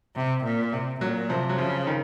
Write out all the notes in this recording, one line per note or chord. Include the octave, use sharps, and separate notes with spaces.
C3
A#2
C3
A#2 F#3
C3 F3
F#3
C#3 F3
D#3